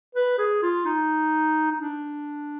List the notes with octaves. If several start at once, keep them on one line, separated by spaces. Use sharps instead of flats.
B4
G#4
F4
D#4
D#4
D4